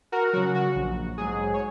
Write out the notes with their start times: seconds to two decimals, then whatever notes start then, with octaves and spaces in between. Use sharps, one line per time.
0.12 F#4 A#4
0.33 C#3 F#3 F#4
0.55 F#4
0.76 A#1
1.18 G#2 F#3 G#4
1.54 C#5